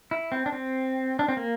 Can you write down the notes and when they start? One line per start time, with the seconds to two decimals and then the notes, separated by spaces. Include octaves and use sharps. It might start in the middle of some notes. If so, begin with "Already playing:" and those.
0.11 E4
0.32 C4
0.46 D4
0.52 C4
1.19 D4
1.28 C4
1.37 A#3